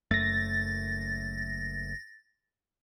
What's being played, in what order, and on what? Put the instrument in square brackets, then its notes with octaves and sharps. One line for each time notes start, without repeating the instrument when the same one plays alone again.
[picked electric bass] F#1 F#2 A3 [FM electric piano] A6 A#6